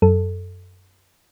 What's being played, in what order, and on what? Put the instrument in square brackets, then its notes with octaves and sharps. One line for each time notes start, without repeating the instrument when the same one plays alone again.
[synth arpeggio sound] F#2 A4